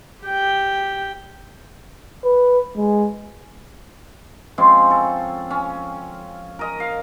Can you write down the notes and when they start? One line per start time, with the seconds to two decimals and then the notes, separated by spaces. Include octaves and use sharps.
0.24 G4 G5
2.25 B4
2.77 G#3
4.58 F3 G#3 C4 C#4
4.90 A4
5.50 C#4
6.59 A#4 D#5
6.80 F5